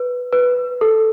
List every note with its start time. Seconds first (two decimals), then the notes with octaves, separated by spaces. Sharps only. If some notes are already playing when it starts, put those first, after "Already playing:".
Already playing: B4
0.33 B4
0.81 A4